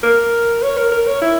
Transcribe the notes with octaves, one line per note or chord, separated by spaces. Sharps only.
A#4
C#5
A#4
A#4
C#5
E4